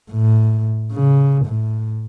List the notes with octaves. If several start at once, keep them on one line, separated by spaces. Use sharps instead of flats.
A2
C#3
A2